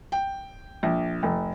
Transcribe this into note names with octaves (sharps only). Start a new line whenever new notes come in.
G5
A#1
F1